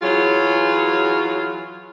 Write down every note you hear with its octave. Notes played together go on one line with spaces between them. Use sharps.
E3 F#3 F4 G#4 C#5